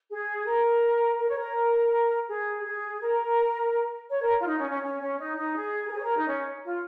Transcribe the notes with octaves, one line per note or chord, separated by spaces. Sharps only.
G#4
A#4
A#4
C#5
A#4
G#4
G#4
A#4
C#5
A#4
F4
D#4
C#4
C#4
C#4
C#4
D#4
D#4
G#4
A#4
G#4
C#5
A#4
D#4
C#4
F4